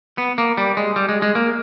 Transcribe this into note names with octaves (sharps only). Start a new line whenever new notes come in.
B3
A#3
G3
G#3
G3
G#3
G#3
A#3